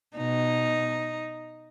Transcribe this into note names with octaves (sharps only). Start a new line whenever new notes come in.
B2 D#4